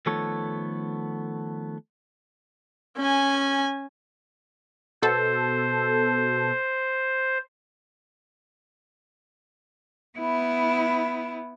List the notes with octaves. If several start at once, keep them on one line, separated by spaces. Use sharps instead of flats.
D#3 F3 A3 B3 A4 C#5
C#4 G#5
B2 A4 C5
B3 E4